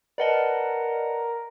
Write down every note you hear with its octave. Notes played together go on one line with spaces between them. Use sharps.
A#4 B4 D5 D#5 F#5 A5